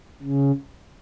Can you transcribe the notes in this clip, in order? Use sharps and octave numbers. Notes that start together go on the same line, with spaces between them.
C#3